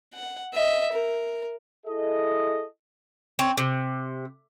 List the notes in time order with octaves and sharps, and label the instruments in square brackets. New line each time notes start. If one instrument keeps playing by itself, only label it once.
[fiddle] F#5
D#5 E5
A#4
[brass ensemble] E4 G#4 A4 D#5
[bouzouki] C4 C#4
C3